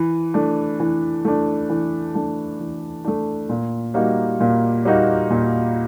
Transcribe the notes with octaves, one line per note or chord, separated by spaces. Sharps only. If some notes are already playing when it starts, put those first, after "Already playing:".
Already playing: E3
A3 D4
E3
A3 D4
E3
A3 D4
E3
A3 D4
A#2
G3 A#3 D#4 F#4
A#2
G3 A#3 D#4 F#4
A#2